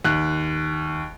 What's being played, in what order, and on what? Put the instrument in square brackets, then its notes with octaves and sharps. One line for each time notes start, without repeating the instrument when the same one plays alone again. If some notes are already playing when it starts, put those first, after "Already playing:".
[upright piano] D#2 F#6